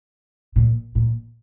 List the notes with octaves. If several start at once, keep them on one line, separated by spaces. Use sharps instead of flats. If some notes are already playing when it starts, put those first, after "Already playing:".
A#2
A#2